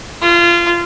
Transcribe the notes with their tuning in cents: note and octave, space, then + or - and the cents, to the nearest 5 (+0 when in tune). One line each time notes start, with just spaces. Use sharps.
F4 -25